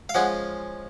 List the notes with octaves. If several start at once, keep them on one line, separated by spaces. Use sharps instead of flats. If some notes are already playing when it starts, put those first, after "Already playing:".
F5
F3 G#3 C#4 F4 F#5